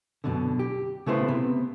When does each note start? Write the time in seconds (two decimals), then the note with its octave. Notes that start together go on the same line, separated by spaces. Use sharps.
0.24 F#2 B2 D3
0.59 G4
1.06 C#3 A3 B3 E4 C5
1.28 C3 B3